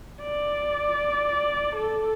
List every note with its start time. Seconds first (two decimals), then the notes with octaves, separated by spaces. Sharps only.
0.22 D5
1.75 A4